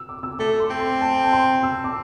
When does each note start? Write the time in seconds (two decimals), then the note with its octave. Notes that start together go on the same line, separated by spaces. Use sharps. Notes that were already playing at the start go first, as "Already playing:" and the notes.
Already playing: E6
0.09 D6
0.23 E6
0.39 A3 D6
0.60 C6
0.70 C4
0.80 C6
1.01 A5
1.24 A5
1.33 C6
1.63 E6
1.84 D6